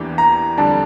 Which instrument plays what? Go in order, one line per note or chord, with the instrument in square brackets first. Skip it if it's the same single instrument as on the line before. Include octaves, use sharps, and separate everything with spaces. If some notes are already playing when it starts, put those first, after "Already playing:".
Already playing: [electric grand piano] E2 E3 A#3 D4 G4
[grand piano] A#5
[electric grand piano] F2 D3 G3 D4 [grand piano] A5